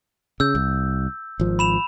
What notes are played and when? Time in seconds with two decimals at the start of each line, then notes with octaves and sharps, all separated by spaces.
0.40 C#3 E6 G6
0.55 C2
1.40 G#1 F3
1.59 B5 E7 F7